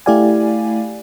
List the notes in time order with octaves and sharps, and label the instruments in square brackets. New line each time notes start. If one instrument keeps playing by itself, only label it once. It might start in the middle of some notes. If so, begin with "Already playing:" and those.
[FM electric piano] A3 E4 G4 D5 F5 G#5